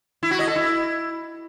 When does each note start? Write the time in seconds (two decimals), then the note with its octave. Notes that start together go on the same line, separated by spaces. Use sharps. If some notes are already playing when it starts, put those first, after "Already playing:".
0.23 E4
0.31 F#4
0.39 D#5
0.47 A4
0.56 E4